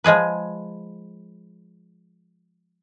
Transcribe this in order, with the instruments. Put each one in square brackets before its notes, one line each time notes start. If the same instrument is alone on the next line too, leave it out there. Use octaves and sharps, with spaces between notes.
[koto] F3 G#3 G#4 B4